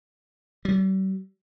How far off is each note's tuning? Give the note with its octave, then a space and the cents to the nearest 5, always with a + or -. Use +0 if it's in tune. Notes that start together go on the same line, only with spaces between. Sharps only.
G3 -45